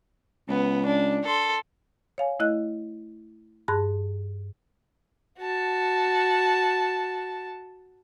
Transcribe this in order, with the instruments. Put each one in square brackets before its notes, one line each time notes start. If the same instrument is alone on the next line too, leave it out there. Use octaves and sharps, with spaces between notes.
[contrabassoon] C#2 [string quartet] B3
[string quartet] D4
A4 C6
[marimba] C#5 F5 G#5
A3 E4 D#5 F#6
G2 G#4 A5 C6 F#6
[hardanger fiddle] F#4 A5